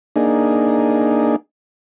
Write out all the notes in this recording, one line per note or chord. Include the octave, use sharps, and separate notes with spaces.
A#3 D4 D#4 G#4